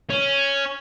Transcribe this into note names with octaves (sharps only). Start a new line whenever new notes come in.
C#4